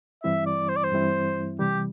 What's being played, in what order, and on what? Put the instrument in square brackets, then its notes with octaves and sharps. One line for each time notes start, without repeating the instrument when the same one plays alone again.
[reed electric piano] G2 E3 G3 C4 E4 [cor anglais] E5
[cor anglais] D5
C5
D5
C5
[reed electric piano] G2 E3 G3 C4 E4
[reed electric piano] C3 E3 G3 [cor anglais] G4